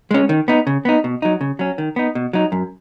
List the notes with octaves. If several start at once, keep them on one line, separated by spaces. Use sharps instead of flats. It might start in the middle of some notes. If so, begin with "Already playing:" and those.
G#3 C#4
D#3
B3 D#4
C#3
B3 D#4
B2
F#3 D#4
C#3
F#3 C#4
D#3
B3 D#4
B2
F#3 D#4
F#2